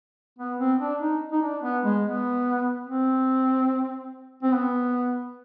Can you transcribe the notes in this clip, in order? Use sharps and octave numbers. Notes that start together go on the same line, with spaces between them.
B3
C4
D4
D#4
D#4
D4
B3
G#3
B3
C4
C4
B3